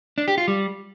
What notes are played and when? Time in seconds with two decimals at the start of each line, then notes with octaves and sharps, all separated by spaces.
0.18 D4
0.28 G4
0.38 F4
0.48 G3